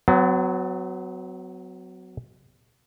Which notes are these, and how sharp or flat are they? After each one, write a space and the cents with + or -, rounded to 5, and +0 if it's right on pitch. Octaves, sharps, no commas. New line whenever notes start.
F#3 +0 B3 +40